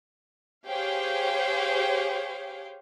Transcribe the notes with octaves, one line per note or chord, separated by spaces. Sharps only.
G4 G#4 C5 C#5 F5 G5